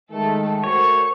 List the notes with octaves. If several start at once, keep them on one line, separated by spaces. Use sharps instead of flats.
D#3 G#3 A3 A4 A5
A3 F#4 A#4 C5 C#5 C#6